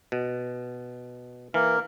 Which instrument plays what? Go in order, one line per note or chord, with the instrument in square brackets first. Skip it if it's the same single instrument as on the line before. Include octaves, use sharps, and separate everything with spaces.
[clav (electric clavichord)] B2
[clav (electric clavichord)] E3 [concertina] A#3 A#4